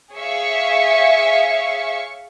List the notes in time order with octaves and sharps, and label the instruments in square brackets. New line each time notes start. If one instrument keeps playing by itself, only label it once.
[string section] G#4 C#5 E5 F5 C#6